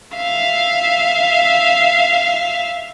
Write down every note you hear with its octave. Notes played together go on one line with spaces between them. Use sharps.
E5 F5